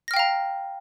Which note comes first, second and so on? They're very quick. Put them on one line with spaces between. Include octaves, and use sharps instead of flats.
A#6 F6 G5 F5 A#5